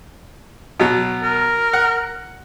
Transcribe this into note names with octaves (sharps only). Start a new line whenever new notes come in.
B2 F#3
A#4
F#5